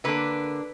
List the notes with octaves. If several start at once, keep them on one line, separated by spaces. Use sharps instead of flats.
D3 A#3 D4 B4